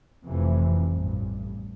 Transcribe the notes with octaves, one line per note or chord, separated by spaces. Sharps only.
F1 F2 C3 E3
A1 G2